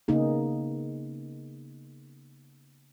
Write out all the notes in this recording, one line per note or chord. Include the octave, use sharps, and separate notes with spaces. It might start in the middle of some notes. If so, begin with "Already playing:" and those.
C#3 A#3 B3 D#4 G#4